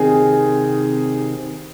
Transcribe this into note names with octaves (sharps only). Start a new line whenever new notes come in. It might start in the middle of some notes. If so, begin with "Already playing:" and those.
Already playing: C3 D#3 C4 G#4